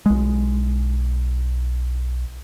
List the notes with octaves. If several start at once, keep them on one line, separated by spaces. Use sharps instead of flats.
B1 G#3